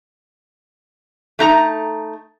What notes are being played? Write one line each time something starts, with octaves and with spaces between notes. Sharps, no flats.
A3 D#4 A#5